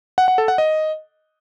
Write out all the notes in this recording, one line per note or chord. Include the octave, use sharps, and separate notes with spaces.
F#5
F#5
A4
F#5
D#5